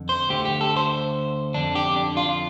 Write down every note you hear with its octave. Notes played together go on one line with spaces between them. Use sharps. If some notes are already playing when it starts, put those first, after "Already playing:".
Already playing: F2 D3
C5
D2 D3 G4
G4
A4
C5
F2 D3 D4
G4
D4
F4